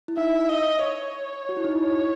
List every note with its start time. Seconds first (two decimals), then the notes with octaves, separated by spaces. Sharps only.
0.08 E4
0.17 D#4 E5
0.49 D#5
0.82 C#5
1.49 F#4
1.57 E4
1.64 D#4
1.71 E4
1.81 C#5